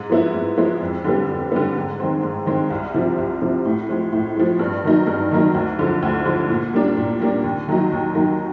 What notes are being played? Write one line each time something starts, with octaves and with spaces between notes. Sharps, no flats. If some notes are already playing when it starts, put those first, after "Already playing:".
Already playing: G#2
F3 G#3 B3 E4
G#2
F3 G#3 B3 E4
F2
D3 G3 B3
F2
D3 G3 B3
G#2
D#3 G#3 C4
G#2
D#3 G#3 C4
C2
C3 F3
C2
C3 F3
A2
F3 G#3
A2
F3 G#3
G2
D#3 F#3 A#3 D#4
G2
D#3 F#3 A#3 D#4
D2
D3 F3 G#3
D2
D3 F3 G#3
A#2
G3 A#3 D4
A#2
G3 A#3 D4
D#2
D#3 F#3 A#3 D#4
D#2
D#3 F#3 A#3 D#4